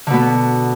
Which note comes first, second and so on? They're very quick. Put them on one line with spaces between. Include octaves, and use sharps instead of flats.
D3 B2 B3